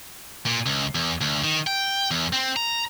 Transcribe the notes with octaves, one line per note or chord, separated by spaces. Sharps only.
A#2
C#2
E2
D2
D#3
G5
E2
C4
A#5